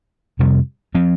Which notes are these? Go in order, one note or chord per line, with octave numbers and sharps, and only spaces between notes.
F2 C3 G3
F3 C4